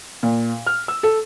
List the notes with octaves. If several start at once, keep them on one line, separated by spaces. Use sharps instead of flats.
A#2
F6
E6
A4